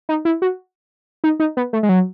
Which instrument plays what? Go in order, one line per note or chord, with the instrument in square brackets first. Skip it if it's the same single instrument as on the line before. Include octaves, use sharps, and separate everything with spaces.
[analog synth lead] D#4
E4
F#4
D#4
D#4
B3
A3
G#3
F#3